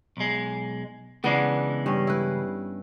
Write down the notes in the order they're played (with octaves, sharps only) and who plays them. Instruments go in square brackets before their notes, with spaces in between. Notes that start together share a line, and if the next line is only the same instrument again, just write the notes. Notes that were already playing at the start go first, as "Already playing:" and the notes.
[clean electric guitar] B1 G#3
[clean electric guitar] C#3 E3 G#3 [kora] B3 D4
[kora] G2 G3 C#4
E4 B4